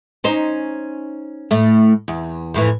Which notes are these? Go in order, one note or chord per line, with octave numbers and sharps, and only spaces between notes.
C#4 D#4 C5
A2 A3
E2
F2 A2 E3